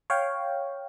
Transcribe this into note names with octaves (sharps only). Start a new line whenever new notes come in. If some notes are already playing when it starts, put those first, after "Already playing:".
C#5 F5 G5